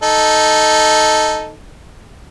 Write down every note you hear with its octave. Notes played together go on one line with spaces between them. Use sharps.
D#4 A4